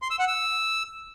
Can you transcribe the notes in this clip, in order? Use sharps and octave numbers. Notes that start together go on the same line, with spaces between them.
C6
E6
F#5
E6